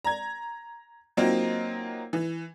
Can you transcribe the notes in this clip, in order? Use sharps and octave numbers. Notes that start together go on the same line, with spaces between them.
A#5 G#6
F#3 A#3 C4 D#4 F4
E3